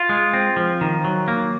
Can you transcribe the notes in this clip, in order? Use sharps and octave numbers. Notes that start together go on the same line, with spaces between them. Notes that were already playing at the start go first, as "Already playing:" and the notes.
Already playing: F4
G#3
C4
F3
D#3
F#3
A#3